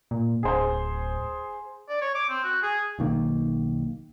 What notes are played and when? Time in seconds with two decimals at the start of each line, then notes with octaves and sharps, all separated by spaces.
0.11 A#2
0.43 D1 G#4 C5
1.89 D5
2.01 C#5
2.15 D6
2.29 C4
2.43 F#4
2.62 G#4
2.99 B1 D#3 A#3